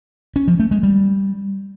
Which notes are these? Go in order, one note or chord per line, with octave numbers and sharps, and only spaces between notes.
C#4
F3
A3
G#3
G3